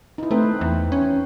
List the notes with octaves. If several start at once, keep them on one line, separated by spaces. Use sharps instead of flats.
D#4 E4
A3 C4 B4 C5
E2
C#4